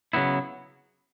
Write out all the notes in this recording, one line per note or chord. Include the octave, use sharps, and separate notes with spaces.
C#3 F#3 B3 E4